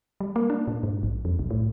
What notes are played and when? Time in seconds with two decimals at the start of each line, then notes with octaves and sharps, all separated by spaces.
0.20 G3
0.36 A#3
0.50 D4
0.68 A#2
0.83 G#2
1.03 A#1
1.25 F2
1.39 B1
1.51 A2